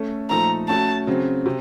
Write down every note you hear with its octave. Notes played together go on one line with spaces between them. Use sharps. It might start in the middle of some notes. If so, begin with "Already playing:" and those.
Already playing: A3 C#4 A4
A#2 F3 A3 D#4 A4 A#5
A3 C#4 F#4 A5
C#3 F#3 C4
C3